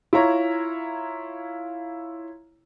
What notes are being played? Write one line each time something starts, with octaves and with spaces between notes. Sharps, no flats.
E4 F4 C#5 A#5